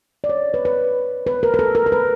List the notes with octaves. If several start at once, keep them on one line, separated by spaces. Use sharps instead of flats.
D5
C#5
B4
B4
B4
A#4
A#4
A4
A#4
A#4
B4